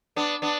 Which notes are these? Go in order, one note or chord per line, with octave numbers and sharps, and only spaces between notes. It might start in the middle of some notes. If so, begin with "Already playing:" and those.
B3 D4
B3 D4